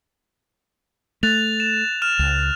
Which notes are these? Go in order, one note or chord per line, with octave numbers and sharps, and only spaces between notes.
A3 F#6 A6 F7
E7
F6 E7
C#2